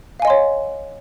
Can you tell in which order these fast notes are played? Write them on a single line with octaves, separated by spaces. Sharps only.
F5 G#5 D#5 C6 C#5